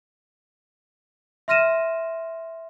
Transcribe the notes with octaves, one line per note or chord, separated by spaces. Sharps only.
E5 C6 F6 A#6 D#7 E7